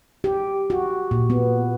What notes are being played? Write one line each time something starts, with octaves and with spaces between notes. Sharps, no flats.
G4
F#4
A#2
B3